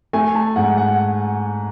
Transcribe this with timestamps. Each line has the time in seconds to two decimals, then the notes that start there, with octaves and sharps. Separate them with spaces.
0.13 A3 G#5
0.35 A5
0.56 G#2 F#5
0.78 F#5